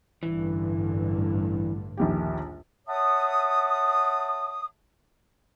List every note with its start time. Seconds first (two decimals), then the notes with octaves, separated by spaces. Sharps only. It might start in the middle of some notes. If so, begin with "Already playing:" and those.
0.23 A1 G2 D3 E3
1.97 A#1 D#2 G4
2.88 C#5 E5 F#5 A5 D#6